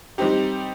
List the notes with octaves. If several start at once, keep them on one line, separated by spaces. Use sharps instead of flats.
G3 C4 D#4 G4